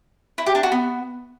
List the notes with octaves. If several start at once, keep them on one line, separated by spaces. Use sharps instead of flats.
E4
G4
D4
F#4
B3